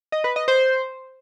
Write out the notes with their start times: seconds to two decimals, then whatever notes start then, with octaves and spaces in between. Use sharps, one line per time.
0.12 D#5
0.24 B4
0.36 D#5
0.48 C5